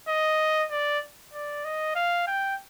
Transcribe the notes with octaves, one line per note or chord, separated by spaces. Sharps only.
D#5
D5
D5
D#5
F5
G5